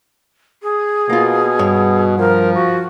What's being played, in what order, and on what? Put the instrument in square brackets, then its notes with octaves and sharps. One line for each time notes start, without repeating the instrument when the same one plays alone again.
[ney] G#4
[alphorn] B2 [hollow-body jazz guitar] A#3 F4
[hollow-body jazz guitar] G2 C#5
[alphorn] F3 [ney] A#4
[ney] F#4